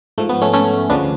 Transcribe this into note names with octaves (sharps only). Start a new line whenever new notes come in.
G#2 F3 A3
B3
A3 C#4
A3 C#4
D2 C#3 F3 B3 D4